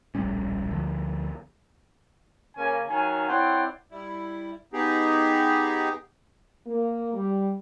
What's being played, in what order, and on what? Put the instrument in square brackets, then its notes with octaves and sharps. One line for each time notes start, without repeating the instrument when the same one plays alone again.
[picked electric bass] D1 A#1 G3 C#4
D2 D3 F3
[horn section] C#3 A#3 C#4 G#5
D#3 F#3 F5 G#5
C4 E4 C#5 D5 F#5
[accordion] G3 E4
B3 D#4 G4 G#4
[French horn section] A#3
G3